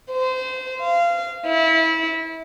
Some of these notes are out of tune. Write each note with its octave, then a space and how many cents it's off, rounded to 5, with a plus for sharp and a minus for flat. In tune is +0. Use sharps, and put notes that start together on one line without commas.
C5 -25
F5 -20
E4 -25